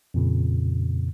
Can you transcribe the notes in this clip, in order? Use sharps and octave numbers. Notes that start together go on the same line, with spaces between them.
F2 A#2 C#3